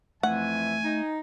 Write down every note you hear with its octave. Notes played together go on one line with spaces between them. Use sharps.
F2 E3 A3 E5 F#5 G#5
D#4